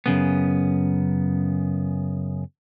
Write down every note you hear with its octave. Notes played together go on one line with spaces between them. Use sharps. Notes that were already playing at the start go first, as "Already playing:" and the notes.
F#2 C#3 B3